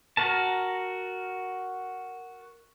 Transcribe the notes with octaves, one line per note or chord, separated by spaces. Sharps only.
F#4 A#4 A5